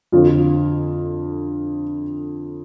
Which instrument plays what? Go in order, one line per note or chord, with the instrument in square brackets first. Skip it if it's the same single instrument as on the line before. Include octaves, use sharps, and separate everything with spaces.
[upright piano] F2 D3 F4